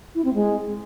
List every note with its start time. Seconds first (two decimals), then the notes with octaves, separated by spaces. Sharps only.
0.15 E4
0.24 C4
0.34 G#3